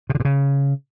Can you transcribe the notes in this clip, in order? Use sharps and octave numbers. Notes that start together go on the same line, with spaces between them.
C3
D3
A#2
C#3